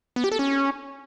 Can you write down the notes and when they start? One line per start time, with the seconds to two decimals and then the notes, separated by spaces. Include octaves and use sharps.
0.16 B3
0.24 G4
0.32 A4
0.39 C#4